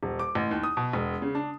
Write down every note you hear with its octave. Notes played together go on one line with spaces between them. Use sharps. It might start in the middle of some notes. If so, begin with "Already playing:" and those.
D#1
D6
A1
D#2
D#6
B2
E1
C#3
D4